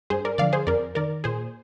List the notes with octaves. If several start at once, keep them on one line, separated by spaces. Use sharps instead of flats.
G2 G#4 C5
A#4 D5
D3 F3 D5 F5
G#4 C5
F2 A#4 D5
D#3 A#4 D5
A#2 G#4 C5